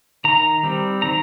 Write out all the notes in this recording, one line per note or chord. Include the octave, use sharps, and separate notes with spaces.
D#3 A#5
G3 C4
D#3 A#5